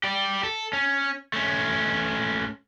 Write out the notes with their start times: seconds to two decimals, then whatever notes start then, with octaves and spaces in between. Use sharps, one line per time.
0.04 G4 D5
0.43 A4
0.73 C#4
1.34 A3 C#4